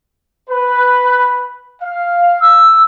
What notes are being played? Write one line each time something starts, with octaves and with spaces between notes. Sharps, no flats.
B4
F5
E6